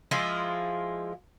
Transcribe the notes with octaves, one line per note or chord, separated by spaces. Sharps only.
F3 G#3 E4 F4